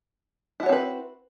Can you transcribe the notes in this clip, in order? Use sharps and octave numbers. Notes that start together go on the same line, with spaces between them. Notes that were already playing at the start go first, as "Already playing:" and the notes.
C4 E4 F#4 B4 C#5